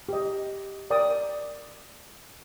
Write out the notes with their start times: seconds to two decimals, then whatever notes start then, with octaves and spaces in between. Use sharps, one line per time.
0.09 G4 D#5
0.90 A#4 D5 G5 D6 D#6